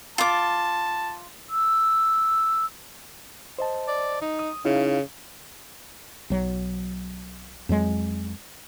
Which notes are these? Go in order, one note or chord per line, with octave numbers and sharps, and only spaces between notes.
F4 A5 D6
E6
C5 D#5 A5
D5
D#4
D#6
C#3 D#4 E4 F5
B1 F#3
F2 F#3 G#3